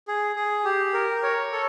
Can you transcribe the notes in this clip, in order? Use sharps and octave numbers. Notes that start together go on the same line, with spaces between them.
G#4
G#4
G4
A#4
C#5
A4